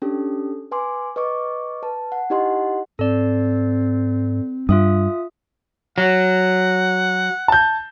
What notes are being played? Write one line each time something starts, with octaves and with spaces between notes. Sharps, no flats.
C#4 D4 G4 A4
B4 G#5 C6 D6
B4 D#5 C#6 D6
B4 A5
F#5
D#4 E4 G4 D#5 F#5 C6
G#2 C4 A4 D5
G2 F4 E5 D#6
F#3 F#5
A5 G6